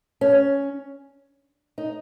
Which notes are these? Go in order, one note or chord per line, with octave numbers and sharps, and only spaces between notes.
C#4
D#4